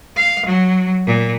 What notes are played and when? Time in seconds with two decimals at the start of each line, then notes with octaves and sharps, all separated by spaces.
0.16 F5
0.46 F#3
1.06 A#2